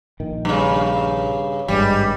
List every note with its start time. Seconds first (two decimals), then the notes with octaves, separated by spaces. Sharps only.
0.20 A#1 D#3
0.45 G2 C#3
1.68 G#1 G2 G3 G#3